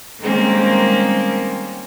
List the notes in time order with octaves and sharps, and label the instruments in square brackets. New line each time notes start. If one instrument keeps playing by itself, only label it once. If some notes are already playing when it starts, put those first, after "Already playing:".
[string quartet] D#3 G3 G#3 A#3 C4 C#4